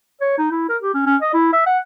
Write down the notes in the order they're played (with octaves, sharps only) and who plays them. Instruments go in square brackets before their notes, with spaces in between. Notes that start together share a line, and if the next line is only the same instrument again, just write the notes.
[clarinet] C#5
D#4
E4
A#4
G4
C#4
C#4
D#5
E4
E5
F#5